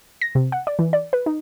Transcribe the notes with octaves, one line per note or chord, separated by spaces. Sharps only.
A#6
C3
F#5
D5
E3
D5
B4
D#4